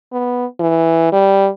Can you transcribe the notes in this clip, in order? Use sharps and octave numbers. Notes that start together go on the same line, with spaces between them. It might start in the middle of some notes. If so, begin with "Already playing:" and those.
B3
E3
G3